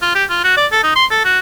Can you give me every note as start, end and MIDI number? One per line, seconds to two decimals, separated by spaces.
0.02 0.13 65
0.15 0.25 67
0.29 0.39 65
0.44 0.54 66
0.57 0.66 74
0.72 0.79 69
0.83 0.95 63
0.95 1.05 84
1.11 1.21 69
1.25 1.39 66